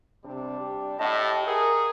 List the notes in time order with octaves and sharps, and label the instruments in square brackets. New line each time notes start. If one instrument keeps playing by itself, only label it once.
[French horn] C3 [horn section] G3 D4
[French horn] G4
[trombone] A2 [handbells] D#5 E5 F#5 [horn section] A5
[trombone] G#4 [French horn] A#4 [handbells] F#5 [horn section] A#5